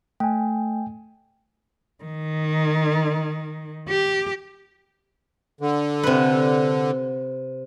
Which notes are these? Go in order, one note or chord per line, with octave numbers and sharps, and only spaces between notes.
A3 G5 G#5
D#3
G4
D3
C3 B4